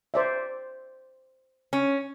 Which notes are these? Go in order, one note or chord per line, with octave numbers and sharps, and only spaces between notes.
C5 D5 E5
C#4